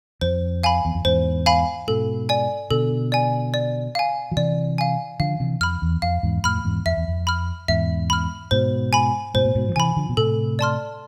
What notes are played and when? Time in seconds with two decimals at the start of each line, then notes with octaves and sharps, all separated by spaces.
0.21 F2 C5
0.63 F5 G#5 B5
0.85 E2
0.95 F2
1.05 E2 G#2 C5
1.46 F5 G#5 B5
1.87 G#2 B2 A4
2.29 D5 G#5
2.70 B2 D3 A4
3.12 D5 G#5
3.54 D5
3.95 F5 G#5
4.32 F3
4.37 C3 E3 D5
4.78 F5 G#5
5.20 D3 F3 F5
5.40 C3 E3
5.60 F2 B5 F6
5.82 E2
6.02 F2 F5
6.23 E2 G#2
6.44 F2 A2 B5 F6
6.64 E2 G#2
6.86 F2 E5
6.97 E2
7.08 F2
7.27 B5 F6
7.68 E2 G#2 E5
8.10 B5 F6
8.51 G#2 B2 C5
8.93 G#5 B5
9.34 G#2 B2 C5
9.45 A2
9.55 G#2 B2
9.69 F3
9.76 C3 E3 G#5 B5
9.96 D3 F3
10.09 B2
10.17 A2 C3 A4
10.59 D5 A5 C6 F6